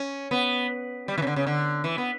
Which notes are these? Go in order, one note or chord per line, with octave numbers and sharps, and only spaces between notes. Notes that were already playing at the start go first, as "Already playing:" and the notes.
Already playing: C#4
B3
G3
E3
C#3
D3
C#3
D3
E3
B3